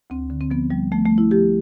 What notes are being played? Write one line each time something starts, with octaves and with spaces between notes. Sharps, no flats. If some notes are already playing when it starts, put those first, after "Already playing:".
D2 C4
D3
C4
F3 B3
F3 G3
F3 A3
A3
F3
E4
F3 G4